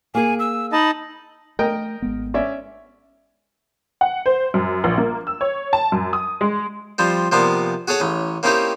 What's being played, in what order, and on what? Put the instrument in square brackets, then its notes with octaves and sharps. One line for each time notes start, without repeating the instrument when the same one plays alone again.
[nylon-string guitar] A#3 G#4 [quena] G#5
[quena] E6
[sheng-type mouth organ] D#4 D#5 A5 [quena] B5
[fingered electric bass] A3 [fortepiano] A#4 D#5 G5
[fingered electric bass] G#1 G#3 B3
[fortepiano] C#4 D5 E5
[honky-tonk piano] F#5
C5
F#2
A#1
A#3
E6
C#5
A5
F#2
D#6
G#3
[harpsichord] F3 G3 C4
C3 F3 A#3 B3 D5
F#4 G#4 A4 C#5 F#5
A1 C#4
A#3 C4 C#4 D#4 E4 G4